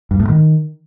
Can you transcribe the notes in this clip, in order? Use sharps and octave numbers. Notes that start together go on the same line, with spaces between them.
G2
A2
D#3